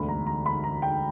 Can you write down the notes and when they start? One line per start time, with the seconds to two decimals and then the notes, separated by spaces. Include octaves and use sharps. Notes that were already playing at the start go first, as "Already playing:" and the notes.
Already playing: E1 D2 D3 B5
0.08 A#5
0.27 A#5
0.46 B5
0.64 A#5
0.82 G5